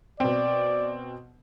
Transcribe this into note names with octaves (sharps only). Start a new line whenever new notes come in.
B2 C4 D5